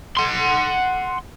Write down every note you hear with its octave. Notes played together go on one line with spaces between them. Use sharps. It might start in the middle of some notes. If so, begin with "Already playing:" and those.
F#5 C6